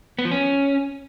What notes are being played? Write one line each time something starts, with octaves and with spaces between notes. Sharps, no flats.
B3
F3
C#4